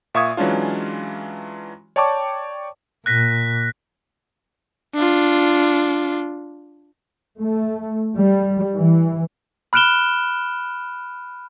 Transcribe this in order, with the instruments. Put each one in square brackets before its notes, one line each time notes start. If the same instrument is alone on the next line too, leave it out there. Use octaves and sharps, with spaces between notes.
[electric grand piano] A#2 E5 F5 C#6 D#6 G#6
E3 F#3 G#3 C#4 D4 F4
C#5 D5 G5 A5 C#6 D6
[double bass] A#2 [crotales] F#6 A#6 B6
[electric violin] D4 F4
[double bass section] A3
G3
E3
[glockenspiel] B5 F6 F#6 D7 E7 G7